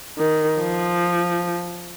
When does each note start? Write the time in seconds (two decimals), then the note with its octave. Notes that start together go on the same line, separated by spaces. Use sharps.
0.18 D#3
0.61 F3